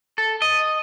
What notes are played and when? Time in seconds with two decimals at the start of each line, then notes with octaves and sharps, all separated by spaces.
0.18 A4
0.42 D#5